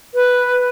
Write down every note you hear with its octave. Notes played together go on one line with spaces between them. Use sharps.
B4